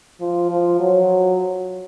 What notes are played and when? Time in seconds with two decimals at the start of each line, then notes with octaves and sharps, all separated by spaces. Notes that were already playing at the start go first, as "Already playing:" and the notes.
0.20 F3
0.50 F3
0.80 F#3